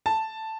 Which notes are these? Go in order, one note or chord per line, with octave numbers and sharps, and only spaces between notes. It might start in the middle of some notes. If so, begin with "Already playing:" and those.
A5